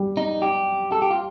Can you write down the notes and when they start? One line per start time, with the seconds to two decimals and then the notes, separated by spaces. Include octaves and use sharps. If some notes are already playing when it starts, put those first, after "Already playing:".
Already playing: G3
0.17 D#4
0.42 G4
0.92 A4
1.02 G4
1.11 F4